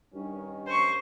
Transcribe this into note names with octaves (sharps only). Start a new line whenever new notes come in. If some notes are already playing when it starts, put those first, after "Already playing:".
G2 D#3 C#4
C5 C#6